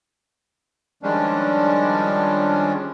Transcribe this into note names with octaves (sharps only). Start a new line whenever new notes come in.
D#3 F3 G3 G#3 C#4 D4